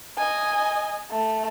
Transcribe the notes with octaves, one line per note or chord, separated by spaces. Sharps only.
D#5 G#5
A3